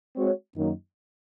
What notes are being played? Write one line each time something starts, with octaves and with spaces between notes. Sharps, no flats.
G#3 C4 F#4 C#5
F#2 D#3 F#3 A#3 D#4